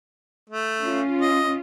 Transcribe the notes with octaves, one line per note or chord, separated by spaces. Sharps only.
A3
C#4 F4
D#5